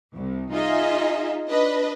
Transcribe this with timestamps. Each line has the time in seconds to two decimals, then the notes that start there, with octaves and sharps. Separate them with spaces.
0.14 C2
0.53 D#4 F4 G#4 D#5 E5
1.49 D4 B4 D#5